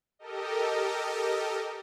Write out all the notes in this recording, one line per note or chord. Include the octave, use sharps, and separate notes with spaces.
G4 A4 A#4 D#5